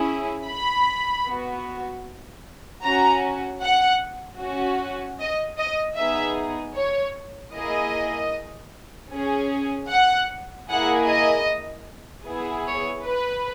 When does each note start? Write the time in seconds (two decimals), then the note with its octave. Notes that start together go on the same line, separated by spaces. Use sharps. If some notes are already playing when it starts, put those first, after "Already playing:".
Already playing: C#4 E4 G#4
0.48 B5
1.28 B3 F#4
2.84 C#4 F#4 A#5
3.63 F#5
4.41 C#4 F#4
5.20 D#5
5.59 D#5
5.98 B3 D#4 G#4 E5
6.77 C#5
7.56 A#3 E4 G#4 D#5
9.12 C#4 G#4
9.91 F#5
10.69 A#3 E4 G#4 F#5
11.09 D#5
12.27 B3 E4 G#4
12.66 C#5
13.05 B4